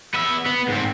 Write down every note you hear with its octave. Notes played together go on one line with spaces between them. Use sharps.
B3 E5
B3
G#2 C4